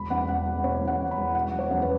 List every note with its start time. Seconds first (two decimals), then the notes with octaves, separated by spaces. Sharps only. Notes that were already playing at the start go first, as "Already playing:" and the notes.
Already playing: E1 B5
0.10 E2 F#5
0.28 E1 F#5
0.46 B2
0.64 B2 C#5
0.81 E2
0.88 F#5
0.99 E1
1.11 B5
1.17 E1
1.35 B2 F#5
1.52 F#3
1.59 C#5
1.71 E2
1.82 B4